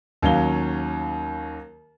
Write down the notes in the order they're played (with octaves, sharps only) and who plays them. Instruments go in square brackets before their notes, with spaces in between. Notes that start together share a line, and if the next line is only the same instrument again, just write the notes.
[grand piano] D#2 F#3 C#4 F5 G7